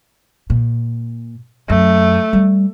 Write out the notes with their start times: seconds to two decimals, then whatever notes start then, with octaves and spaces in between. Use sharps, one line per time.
0.50 A#2
1.70 F#2 A3
2.33 G3